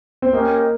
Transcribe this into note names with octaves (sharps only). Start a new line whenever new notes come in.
C4
A#3 C#4 G4 A#4 D#5 G5